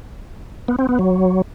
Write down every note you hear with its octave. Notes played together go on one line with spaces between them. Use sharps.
B3
C4
B3
F#3